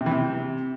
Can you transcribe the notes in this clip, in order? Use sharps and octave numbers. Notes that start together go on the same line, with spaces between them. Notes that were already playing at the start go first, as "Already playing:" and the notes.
C3
E3
C3